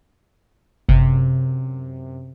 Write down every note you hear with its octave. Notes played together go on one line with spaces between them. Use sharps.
G1 F#2 C3